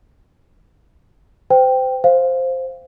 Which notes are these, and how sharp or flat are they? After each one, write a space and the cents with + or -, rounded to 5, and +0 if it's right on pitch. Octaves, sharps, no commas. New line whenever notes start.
C5 -30 G5 +0
C5 +0 F5 +0